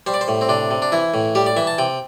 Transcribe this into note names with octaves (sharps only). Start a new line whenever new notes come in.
G3 C5
D5
C5
A2
C4
C3 D4
C3
D4
E3 E4
A2
G3 G4
D5
E3 E5
A5
C3 G5